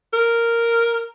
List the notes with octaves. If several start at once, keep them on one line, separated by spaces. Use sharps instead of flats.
A#4